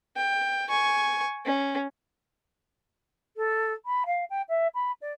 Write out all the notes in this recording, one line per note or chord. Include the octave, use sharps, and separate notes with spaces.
G5
G#5 C#6
C#4
A4
B5
F5
G5
E5
B5
D5